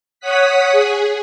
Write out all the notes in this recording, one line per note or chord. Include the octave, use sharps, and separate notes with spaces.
C#5 F#5 D#6 F#6 B6
G#4